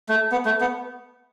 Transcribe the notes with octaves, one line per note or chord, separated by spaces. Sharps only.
A3
B3
A3
B3